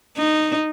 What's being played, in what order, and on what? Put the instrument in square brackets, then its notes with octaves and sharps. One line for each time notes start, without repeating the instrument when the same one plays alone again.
[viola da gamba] D#4